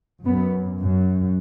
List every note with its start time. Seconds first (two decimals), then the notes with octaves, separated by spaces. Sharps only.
0.25 F#2 B3
0.80 F#2